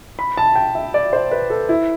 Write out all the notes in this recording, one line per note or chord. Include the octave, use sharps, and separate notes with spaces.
B5
A5
G5
E5
D5
C5
B4
A4
E4